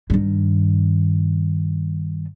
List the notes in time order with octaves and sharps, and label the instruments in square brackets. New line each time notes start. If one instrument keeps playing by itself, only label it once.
[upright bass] G2 D#3